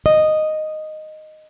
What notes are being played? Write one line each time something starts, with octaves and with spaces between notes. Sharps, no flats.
D#5